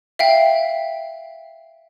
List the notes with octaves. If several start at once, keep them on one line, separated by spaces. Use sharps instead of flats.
E5 F5 G5